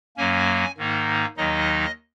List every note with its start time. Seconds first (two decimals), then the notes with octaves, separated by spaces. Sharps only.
0.17 F#2 F#3 A#3 C#4 G#5
0.77 G#2 D#3 A#3 D#4
1.37 D#2 D#3 F#3 D#4 D#5